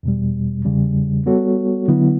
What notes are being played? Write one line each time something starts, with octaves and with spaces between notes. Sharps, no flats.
E2 B2 G3
E2 C#3 G3
G3 B3 F#4 A4 C#5
D3 F#3 B3 E4